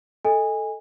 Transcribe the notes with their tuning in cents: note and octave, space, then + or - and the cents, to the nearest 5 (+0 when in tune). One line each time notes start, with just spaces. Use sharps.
A4 +0 D#5 +15 G#5 -20